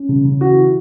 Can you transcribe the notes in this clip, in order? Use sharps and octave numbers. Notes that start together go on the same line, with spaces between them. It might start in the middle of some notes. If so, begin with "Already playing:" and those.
Already playing: C#4
C#3
C#3
E3 F#4
E3